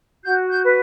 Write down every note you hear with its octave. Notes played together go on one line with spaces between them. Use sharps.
F#4 G6
G6
B4